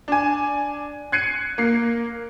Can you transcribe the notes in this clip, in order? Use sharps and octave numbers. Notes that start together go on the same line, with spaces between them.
D4 G#5
F#6 G#6 C7 C#7 D#7
A#3 C7